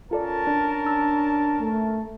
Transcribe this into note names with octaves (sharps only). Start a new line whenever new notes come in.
C#4 F4 A4 A#4 D5 A5
D4
D4 E6
A3